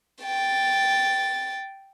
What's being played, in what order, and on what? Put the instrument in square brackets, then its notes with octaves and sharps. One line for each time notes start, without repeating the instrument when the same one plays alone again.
[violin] G5 A6